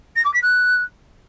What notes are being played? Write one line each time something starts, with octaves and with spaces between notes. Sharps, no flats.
A#6
D6
B6
F#6